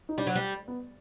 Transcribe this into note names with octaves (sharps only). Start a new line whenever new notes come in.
D#4
G3 D4
F#3
G3
B3